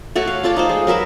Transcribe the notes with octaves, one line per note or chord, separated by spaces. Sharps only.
A3 F#4 C#5 F#5
F5
F4 A4 D5 A5
D#4 F4 C5
G#3
F#3 A#4 B4 E5